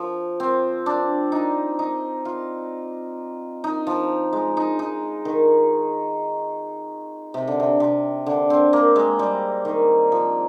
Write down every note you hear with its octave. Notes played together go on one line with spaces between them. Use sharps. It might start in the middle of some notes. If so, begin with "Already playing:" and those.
Already playing: F3
C4
D4
D#4
D#4
F4
D#4
F3
G#3
D#4
D#4
D#3
C3
D3
C3
C3
D3
C4
A#3
G#3
G3
D#3
F3